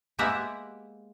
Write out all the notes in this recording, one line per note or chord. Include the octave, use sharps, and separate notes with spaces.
G#3 A#3 B3 G4 E5 F#5